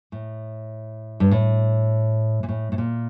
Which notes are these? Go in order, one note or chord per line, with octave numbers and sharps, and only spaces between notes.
A2
G2
A2
A#2
A2
A2
A#2